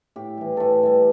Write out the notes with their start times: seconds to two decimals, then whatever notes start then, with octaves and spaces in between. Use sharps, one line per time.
0.16 A2 G4
0.37 E3 G3
0.57 A2 A4 B4
0.83 E3 G3